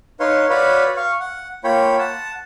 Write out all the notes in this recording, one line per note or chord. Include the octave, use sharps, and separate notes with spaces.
D#4 B4 C#5 F5 C6
F#4 B4 C#5 D5 F5 B5
F5 C#6
F#5
A#3 F4 C#5 G5 B5
F#5 A5